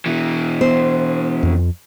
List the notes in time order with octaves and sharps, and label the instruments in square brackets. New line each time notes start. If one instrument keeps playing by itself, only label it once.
[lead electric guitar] B2 E3
[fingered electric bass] B3 [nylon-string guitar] C5
[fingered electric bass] F2